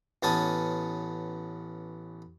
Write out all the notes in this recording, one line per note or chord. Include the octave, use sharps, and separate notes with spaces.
A1 B3 C#4 A5 D#6